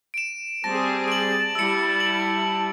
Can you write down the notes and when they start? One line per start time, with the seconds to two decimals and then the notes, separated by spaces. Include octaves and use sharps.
0.14 D7 E7
0.64 G3 C4 G#4 A5 A#6
1.08 D7 F#7
1.55 G3 E4 E6 C#7
2.00 F#7